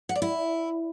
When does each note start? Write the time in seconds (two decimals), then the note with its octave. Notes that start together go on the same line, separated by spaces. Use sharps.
0.09 F#5
0.15 D5
0.22 E4